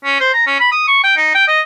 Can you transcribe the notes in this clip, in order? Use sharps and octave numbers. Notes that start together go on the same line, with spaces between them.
C#4
C5
A#5
C#4
B5
D#6
C#6
G5
D#4
G5
D#5